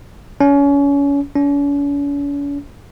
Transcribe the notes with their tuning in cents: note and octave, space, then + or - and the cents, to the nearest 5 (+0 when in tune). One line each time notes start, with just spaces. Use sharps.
C#4 +30
C#4 +45